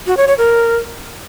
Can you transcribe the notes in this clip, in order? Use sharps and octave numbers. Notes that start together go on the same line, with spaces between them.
F#4
C#5
C#5
A#4